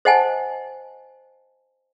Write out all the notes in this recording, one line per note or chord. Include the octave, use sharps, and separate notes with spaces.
C5 D#5 F#5 G#5 A5